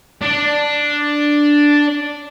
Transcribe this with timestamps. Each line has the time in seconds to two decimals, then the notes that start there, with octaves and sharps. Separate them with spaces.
0.22 D4 D5